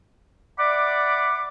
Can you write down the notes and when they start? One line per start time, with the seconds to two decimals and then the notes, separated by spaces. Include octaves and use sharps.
0.59 D5 E5 F#5 B5 D6